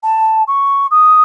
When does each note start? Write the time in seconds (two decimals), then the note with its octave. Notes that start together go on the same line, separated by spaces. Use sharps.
0.03 A5
0.47 C#6
0.91 D#6